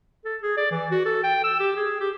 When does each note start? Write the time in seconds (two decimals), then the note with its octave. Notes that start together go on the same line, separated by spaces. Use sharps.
0.25 A4
0.42 G#4
0.57 D5
0.71 E3
0.91 F#4
1.05 A4
1.24 G5
1.44 E6
1.60 G4
1.76 G#4
2.00 G4